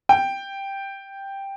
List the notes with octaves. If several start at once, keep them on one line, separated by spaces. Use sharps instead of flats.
G5